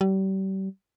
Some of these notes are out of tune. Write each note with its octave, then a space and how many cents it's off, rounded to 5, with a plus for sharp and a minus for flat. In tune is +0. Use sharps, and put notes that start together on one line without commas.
G3 -35